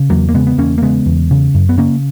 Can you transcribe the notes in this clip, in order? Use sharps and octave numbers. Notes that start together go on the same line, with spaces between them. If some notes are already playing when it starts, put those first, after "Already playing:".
Already playing: C#3
E2 F#3 A#3
A#3
C#3 G#3 B3
B3
E2 A#3 C#4
A#3
C#3 G#3 B3
E2
C#3
F#2
B3
C#3 A#3 C#4